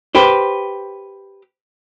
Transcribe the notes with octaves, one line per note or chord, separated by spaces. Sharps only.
G4 B4 C5